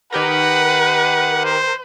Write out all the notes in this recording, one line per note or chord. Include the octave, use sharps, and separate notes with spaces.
D#3 G4 A#4 B4 F#5
C5